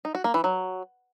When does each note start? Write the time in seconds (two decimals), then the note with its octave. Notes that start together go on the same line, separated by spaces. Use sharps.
0.05 D#4
0.15 F#4
0.24 A#3
0.34 E3
0.44 F#3